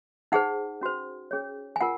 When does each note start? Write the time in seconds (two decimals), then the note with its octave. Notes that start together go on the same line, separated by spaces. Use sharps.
0.32 D#4 G#4 C5 F#5
0.81 C#4 F#4 C5
1.31 C#4 G#4 C#5
1.76 G#5
1.81 F4 A#4 F#5